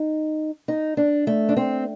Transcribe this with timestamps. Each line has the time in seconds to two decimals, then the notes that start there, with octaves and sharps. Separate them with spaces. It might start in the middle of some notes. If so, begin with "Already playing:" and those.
Already playing: D#4
0.68 D#4
0.97 D4
1.27 A3
1.49 D4
1.57 C4